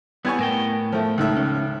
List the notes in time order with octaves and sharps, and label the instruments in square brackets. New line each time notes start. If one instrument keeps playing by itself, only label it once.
[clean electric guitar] G3 E4 [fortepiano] B3 G#5 C#6
[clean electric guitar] A2 A#4 G5
[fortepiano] F3 A3
C#2 D#3 E5
[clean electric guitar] C#4